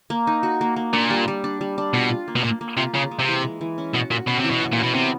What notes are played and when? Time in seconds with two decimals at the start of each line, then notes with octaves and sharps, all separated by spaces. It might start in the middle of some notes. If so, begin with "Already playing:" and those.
0.10 A#3
0.27 D#4
0.43 F#4
0.61 A#3
0.76 A#3
0.93 A#2 D4
1.10 G3
1.28 G3
1.44 D4
1.61 G3
1.78 D4
1.94 B2 F4
2.10 F4
2.28 A#3
2.36 B2
2.44 A#2 A#3
2.61 A#3
2.77 C3 F4
2.94 C#3 F4
3.11 G#3
3.19 C3
3.28 E3
3.45 G#3
3.61 E3
3.78 C#4
3.94 B2 F#4
4.11 A#2 F#4
4.27 B2 C#4
4.40 C3 E3
4.51 B2
4.62 F#4
4.73 A#2 C#4
4.83 B2
4.94 C3 B3